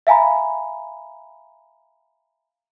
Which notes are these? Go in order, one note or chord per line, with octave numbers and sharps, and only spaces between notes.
E5 F5 G#5 A#5 B5